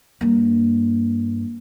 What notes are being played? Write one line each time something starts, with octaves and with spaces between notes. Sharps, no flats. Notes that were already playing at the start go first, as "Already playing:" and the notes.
G2 A#3